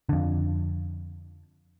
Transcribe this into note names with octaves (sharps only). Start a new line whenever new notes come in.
F2 D3